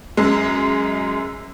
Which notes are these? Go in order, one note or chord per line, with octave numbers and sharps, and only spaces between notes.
F#2 G#3